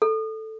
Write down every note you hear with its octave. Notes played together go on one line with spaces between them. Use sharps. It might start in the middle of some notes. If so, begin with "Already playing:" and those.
A4